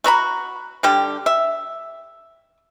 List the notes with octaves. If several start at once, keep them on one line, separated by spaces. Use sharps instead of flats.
A3 F#4 A#5 B5
D3 G3 G4
E5